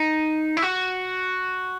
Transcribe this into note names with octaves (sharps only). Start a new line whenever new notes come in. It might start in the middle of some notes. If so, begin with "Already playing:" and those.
Already playing: D#4
E4
F#4